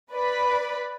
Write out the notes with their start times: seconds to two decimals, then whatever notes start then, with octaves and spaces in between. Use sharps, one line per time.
0.12 B4 D5 B5